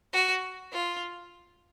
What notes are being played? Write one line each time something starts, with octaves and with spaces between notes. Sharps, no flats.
F#4
F4